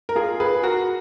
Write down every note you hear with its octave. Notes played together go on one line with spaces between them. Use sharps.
A#4
F4 G#4
G#4 B4
F#4 A#4